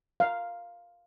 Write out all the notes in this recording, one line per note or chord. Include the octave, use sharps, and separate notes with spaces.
F5